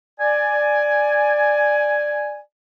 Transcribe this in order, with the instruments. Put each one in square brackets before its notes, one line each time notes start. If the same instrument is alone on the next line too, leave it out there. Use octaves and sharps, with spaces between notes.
[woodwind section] D5 G#5